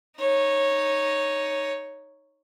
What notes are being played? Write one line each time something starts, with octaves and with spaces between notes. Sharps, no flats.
D#4 C#5